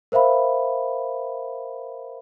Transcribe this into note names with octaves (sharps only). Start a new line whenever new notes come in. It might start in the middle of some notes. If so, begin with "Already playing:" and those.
A#4 C5 E5 F5 B5